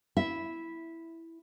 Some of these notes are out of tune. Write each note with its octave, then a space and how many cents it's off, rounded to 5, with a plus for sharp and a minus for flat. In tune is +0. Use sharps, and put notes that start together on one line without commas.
E4 +0 E5 -10